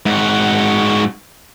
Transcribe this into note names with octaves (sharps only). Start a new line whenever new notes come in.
G#2 F#4